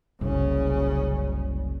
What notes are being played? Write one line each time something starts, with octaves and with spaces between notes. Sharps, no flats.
F#1 C2 C#3 C#4